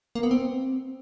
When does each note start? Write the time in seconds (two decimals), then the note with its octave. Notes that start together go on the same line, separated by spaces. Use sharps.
0.15 A#3
0.23 B3
0.31 C4